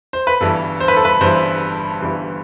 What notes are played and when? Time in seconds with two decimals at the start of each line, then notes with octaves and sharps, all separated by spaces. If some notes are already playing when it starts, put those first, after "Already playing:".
0.13 C5
0.27 B4
0.41 G1 G2 E3 A4
0.80 C5
0.88 B4
0.96 A4
1.05 B4
1.21 G1 G2 E3 C5
2.01 G1 G2 E3